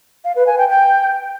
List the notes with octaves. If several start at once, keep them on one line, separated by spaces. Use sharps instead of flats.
F5
B4
G#5
G5
G5